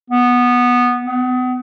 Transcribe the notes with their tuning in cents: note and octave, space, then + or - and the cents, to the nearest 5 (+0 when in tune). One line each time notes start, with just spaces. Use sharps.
B3 -10
B3 +35